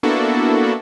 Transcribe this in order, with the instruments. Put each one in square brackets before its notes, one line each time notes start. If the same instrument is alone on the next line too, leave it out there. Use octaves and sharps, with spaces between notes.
[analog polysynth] A#3 B3 D4 E4 F#4 A4